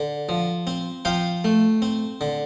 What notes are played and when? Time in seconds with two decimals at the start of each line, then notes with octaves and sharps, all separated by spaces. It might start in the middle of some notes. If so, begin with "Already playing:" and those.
Already playing: D3
0.29 F3
0.67 C4
1.05 F3 F5 G5
1.44 A3
1.82 C4
2.21 D3